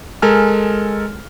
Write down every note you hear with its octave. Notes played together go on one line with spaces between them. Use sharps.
G#3 A4 A#4 G#5 F6